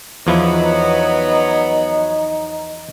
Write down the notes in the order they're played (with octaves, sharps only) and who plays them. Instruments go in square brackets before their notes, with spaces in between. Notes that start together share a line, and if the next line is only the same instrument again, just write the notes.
[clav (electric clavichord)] E2 F3 E4 [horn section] F#3 B3 [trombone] D#4